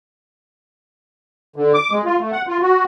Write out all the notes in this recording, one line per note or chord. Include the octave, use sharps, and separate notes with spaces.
D3
D6
G#3
F4
A3
F#5
F4
F#4